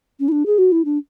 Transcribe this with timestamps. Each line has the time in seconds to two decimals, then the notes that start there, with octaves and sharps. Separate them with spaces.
0.20 C#4
0.28 E4
0.32 D4
0.46 G#4
0.58 F#4
0.72 E4
0.85 D4